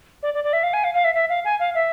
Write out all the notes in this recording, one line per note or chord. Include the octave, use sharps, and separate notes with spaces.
D5
D5
D5
E5
F5
G#5
F5
F5
E5
E5
F5
G#5
F5
E5